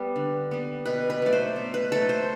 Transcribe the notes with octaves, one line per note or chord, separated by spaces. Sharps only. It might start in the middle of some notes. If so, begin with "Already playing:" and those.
Already playing: G3 B3
D3
G3 B3
B2 B4
B4
F#3 A3 D5
C5
B2
B4
F#3 A3 A4
C5